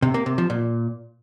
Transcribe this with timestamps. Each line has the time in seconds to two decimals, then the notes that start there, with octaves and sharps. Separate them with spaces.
0.02 C3
0.14 A#3
0.26 C3
0.38 F3
0.50 A#2